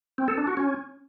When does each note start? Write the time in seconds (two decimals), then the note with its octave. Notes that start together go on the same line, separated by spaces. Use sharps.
0.18 C4
0.28 A4
0.38 D4
0.47 F#4
0.57 C#4